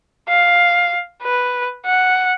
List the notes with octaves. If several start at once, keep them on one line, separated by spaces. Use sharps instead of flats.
F5
B4
F#5